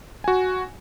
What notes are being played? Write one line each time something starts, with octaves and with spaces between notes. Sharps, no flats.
F#4 G#5